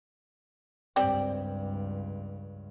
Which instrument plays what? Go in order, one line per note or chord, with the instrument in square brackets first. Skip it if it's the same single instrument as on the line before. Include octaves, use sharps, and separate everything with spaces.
[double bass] C#2 G2 [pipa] C4 G4 D5